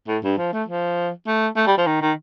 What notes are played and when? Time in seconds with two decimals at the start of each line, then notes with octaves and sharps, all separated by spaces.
0.07 A2
0.23 G2
0.38 F3
0.52 A3
0.68 F3
1.27 A3
1.56 A3
1.67 G3
1.77 F3
1.87 D#3
2.02 D#3